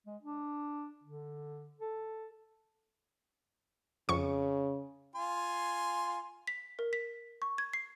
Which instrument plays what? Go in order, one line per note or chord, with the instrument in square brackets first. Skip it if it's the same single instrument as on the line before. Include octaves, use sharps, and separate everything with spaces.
[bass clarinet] G#3
D4
D3
A4
[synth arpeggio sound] F2 C#6 [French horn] C#3
[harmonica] F4 G#5 C6
[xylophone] B6
A#4
B6
C#6
G#6
C7